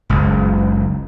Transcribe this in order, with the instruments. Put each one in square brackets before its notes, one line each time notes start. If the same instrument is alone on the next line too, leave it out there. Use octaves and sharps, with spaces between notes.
[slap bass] F#1 C#2